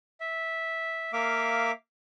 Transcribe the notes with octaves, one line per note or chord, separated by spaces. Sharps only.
E5
A#3 E5 F5 D6